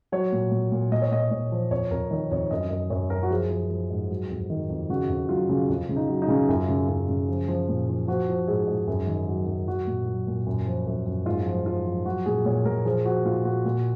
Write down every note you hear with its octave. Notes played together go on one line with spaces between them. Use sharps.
F#3 C#5
A#2
A#2
A#2
A#2 D#5
C#5
A#2 D#5
A#2 C#5
F3
F2 C#5
F2 A#4
D#3 C#5
F2 C#5
F#2 D#5
F#2 D#5
F#2 C#5
F#2 A#4
F#4
F3 G#4
F3
F3
G#2
F#3
F2
D#3
F2
C#3 F#4
F2
F#3 F4
C#3
F2 F4
C#3
D#4
F#3
D#4
C#3
F#2 F4
C#3
F#2
C#3
F3
F3
A#2
F3
F3 F#4
F3
G#2 G#4
G#2
F#2
D#3
F#3
F#2
F#3 F#4
A#2
F#3
A#2
F#2
F3
F#2
F#2
G#2 F4
F3
F3 F4
F3
F#3 F#4
A#2 G#4
A#2 C#5
A#2 A#4
F3 G#4
F3 F#4
A#2 F4
A#2 F#4
A#2